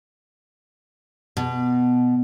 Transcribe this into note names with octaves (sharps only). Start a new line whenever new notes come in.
B2